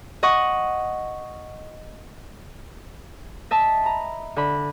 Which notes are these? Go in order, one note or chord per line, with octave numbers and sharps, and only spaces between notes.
D#5 F#5 C#6
D#5 E5 A5
A#5 B5
D3 B5